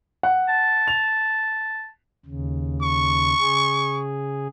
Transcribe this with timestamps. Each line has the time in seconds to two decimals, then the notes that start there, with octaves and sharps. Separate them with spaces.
0.23 F#5
0.49 A5
0.88 F7
2.26 D#2 C#3
2.82 C#6
3.39 C#3 G#4